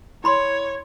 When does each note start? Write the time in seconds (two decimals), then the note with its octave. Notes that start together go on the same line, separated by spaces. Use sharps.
0.24 E4 C#5 B5 C6